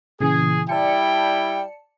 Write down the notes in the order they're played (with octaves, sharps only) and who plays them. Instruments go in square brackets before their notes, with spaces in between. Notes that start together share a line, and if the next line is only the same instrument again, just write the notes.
[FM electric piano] A#2 C#3 E3 [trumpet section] G#4
[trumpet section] G3 E4 G5 [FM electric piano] D5 A5 C#7